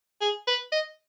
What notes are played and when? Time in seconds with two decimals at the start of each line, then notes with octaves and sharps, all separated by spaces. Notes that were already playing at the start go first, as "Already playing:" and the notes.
0.21 G#4
0.47 B4
0.72 D#5